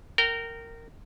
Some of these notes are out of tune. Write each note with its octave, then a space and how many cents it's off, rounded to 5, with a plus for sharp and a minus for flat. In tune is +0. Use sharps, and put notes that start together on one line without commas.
A#4 -15 G5 -25 A#5 +0